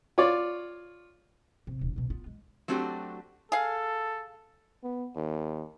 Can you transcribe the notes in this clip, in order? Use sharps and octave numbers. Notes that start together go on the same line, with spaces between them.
F4 C#5 D5
B1 C3
D#1
C2 B2
B3 F4
G#3
F#3 A3 C4 D4 F#4 G4
G#4 A4 F5
B3
D#2